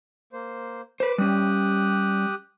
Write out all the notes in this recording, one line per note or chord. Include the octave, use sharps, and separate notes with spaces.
A#3 C5
B4 C5 D6
G3 C#4 G4 D#6 F#6